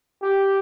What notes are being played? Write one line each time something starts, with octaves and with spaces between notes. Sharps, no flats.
G4